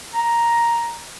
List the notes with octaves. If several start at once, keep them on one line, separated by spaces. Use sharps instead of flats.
A#5